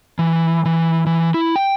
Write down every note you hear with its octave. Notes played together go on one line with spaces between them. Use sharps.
E3
E3
E3
E4
G5